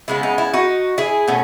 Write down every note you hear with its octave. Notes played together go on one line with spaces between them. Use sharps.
C#3 G#3 B3 E4
D#4
E4
D#4 F#4
E4 G#4
B2 A3 C#4